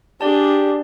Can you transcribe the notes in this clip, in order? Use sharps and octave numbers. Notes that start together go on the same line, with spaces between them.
D4 G4 G#4 D5 A5